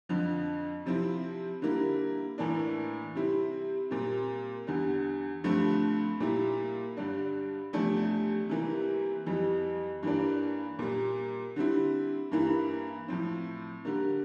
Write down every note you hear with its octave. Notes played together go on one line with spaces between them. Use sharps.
F2 D3 F3
C3 F3 C4 E4
D3 G3 A#3 E4
A2 E3 A#3 D4
C3 G3 C4 E4
A#2 G3 C4
E2 D3 G3
G2 D3 F3 A3 C4
A#2 G3 A#3 E4
G2 D3 G3 D4
E2 C3 F3 A3 D4
C3 E3 G3 A#3
F2 E3 G3
G2 E3 A#3 D4
A#2 G3 A#3
D3 G3 C4 E4
G2 E3 A#3 E4
A2 F3 C4
D3 G3 A#3